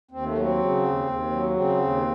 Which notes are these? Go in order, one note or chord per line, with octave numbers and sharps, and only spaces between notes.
D#2 C4
A3
F#3 C4
C#3
D#2
D#2
F#3
C#3 C4
D#2